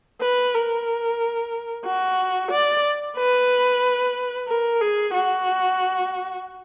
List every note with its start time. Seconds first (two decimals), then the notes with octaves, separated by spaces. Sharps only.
0.21 B4
0.54 A#4
1.85 F#4
2.51 D5
3.17 B4
4.48 A#4
4.81 G#4
5.14 F#4